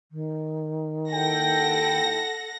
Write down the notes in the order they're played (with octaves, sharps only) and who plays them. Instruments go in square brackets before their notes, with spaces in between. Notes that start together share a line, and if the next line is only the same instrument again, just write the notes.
[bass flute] D#3
[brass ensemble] D#2 E4 G5 [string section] A4 F#5 A#6